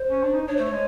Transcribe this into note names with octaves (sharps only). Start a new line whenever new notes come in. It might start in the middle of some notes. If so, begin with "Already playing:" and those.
Already playing: C5
C#4
D4
D#4
D4 C#5
A3 C5
C#5
G#3